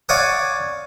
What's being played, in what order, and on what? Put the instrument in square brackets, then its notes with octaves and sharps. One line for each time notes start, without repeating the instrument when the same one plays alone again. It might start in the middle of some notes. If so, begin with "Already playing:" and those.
[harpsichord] C#5 D5 F5 F#5 G#5 D#6